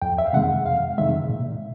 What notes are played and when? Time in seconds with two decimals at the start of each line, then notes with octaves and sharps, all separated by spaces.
0.02 F2 G5
0.18 E5
0.26 F5
0.33 C3 D#3 G#3 F#5
0.66 F2 F5
0.98 C3 D#3 G#3 E5
1.29 A#2